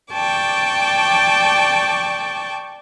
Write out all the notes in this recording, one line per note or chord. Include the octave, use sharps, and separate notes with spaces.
D5 G5 A5 C#6 D6